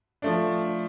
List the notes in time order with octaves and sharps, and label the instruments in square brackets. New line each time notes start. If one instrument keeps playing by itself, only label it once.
[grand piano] F3 A3 D4